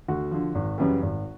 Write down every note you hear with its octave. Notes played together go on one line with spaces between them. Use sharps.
D2 F#4
D3 F3
G#1
F#2 C#3 E3 G3
G#1